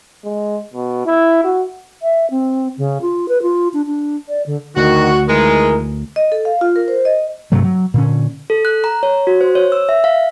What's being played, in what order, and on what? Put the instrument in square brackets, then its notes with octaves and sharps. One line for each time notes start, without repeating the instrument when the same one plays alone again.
[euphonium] G#3
B2
E4
F#4
[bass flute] E5
C4
C#3
F4
B4
F4
D4
D4
D5
D3
[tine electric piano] D2 [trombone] D#3 [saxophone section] F#4
[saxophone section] D#3 E3 G#3 [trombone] A#4
[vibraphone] D#5
A4
F5
F4
A#4
C5
D#5
[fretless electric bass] G2 C3 F#3 A3
F#3
A#2 D3 C#4
[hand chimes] A4
F#6
A#5
C#5
F#4
C5
C#5
E6
E5
F5